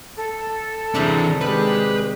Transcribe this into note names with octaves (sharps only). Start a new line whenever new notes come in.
A4
C3 E3 G3 D4 G#4 A#5
D#3 G#3 G4 B4